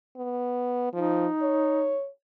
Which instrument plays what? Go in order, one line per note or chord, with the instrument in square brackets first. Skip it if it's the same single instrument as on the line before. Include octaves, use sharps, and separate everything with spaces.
[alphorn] B3
[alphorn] F3 [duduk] D#4
[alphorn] C#5